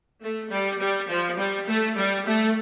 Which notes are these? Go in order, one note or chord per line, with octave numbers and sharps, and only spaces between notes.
A3
G3
G3
F3
G3
A3
G3
A3